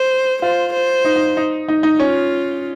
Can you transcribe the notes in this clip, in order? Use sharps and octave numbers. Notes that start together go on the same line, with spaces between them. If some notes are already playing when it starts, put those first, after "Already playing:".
Already playing: C5
F4 C5
C5
D#4
D#4
D#4
D#4
D#4
C#4 F4